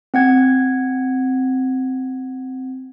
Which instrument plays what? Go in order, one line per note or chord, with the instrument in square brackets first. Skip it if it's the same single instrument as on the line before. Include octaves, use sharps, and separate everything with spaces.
[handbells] C4 F#5 G#6